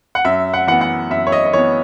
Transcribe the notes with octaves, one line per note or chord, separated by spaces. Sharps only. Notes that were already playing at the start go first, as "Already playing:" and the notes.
F#5
F#2 E5
F#5
E3 B3 F#5
F#5
F#2 E5
C#5
D#5
D#5
E3 B3 C#5